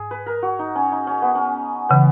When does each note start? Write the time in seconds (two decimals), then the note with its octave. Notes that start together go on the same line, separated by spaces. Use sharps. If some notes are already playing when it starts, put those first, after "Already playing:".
Already playing: G#2 G#4
0.11 B4
0.26 A#4
0.43 F#4
0.59 D#4
0.75 C#4
0.92 D#4
1.07 C#4
1.22 B3
1.35 C#4
1.89 C#3 E3 B3